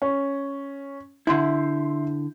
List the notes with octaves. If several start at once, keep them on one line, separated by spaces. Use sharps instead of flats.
C#4
D3 E4 E5 C6 G6